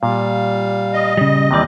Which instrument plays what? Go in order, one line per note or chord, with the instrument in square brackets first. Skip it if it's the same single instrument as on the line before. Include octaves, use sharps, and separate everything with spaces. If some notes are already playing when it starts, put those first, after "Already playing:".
[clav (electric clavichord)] A#2 [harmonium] G3 F5
[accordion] D#5
[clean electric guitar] C#3 G3
[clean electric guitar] D#2 D5 [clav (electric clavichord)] C3 E3 G3